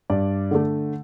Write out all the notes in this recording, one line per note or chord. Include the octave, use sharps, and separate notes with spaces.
G2 D5
D3 A3